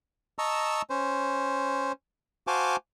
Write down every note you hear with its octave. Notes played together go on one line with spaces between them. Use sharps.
D#5 A5 A#5 C#6 E6
C#4 C5
F#4 C5 F5 G#5 A5 D6